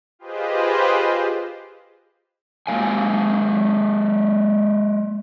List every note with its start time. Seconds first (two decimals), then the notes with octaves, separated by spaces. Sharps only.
0.19 F4 G4 G#4 B4 C5 D#5
2.67 G#3 A#3 F5 G#5